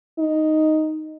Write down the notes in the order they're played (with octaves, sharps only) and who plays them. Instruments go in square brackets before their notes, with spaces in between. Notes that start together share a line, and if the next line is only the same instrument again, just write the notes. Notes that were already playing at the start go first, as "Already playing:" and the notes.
[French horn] D#4